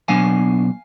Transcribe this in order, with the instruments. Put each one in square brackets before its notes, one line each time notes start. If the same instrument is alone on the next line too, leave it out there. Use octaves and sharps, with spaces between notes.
[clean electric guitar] B2 F#3 B3 D4 F5 G#5